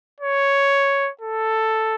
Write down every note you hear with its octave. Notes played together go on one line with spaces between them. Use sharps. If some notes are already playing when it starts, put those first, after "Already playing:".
C#5
A4